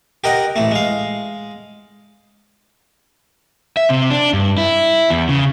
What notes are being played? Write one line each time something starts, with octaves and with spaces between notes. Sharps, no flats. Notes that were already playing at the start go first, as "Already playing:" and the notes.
G4 A#4 D#5 F#5
A1 A3
G#3 F5
E5
C3
D4
G2
E4
E2
C#3